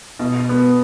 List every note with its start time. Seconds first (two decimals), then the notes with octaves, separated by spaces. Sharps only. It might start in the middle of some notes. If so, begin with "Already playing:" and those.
0.19 B2
0.49 B3